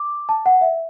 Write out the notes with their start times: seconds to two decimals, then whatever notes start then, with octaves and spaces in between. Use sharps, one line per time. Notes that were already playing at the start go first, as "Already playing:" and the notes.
Already playing: D6
0.29 A5
0.46 F#5
0.61 E5